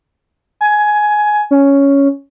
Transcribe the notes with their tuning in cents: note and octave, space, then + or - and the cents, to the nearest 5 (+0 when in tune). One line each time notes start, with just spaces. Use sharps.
G#5 +15
C#4 +5